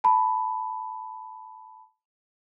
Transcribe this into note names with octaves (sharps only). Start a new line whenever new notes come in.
A5 B5